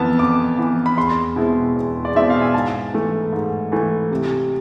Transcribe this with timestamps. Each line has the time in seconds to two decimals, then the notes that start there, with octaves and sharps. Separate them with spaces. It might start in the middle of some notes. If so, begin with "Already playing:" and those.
Already playing: F2 E3 B3 A5
0.19 F2 D6
0.59 E3 B3
0.86 B5
0.97 E2 C6
1.36 B2 G#3 C4 E4
1.75 E2
2.05 D5
2.15 B2 G#3 C4 E4 E5
2.30 F5
2.42 G#5
2.54 G#2 A5
2.94 E3 A3
3.33 G#2
3.72 E3 A3
4.11 C3